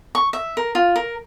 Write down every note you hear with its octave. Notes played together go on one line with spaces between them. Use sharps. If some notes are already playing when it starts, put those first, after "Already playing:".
C#6
E5
A#4
F4
A#4